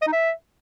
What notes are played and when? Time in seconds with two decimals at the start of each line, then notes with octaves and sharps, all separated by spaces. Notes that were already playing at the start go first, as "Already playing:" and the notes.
0.02 D#5
0.07 D#4
0.13 E5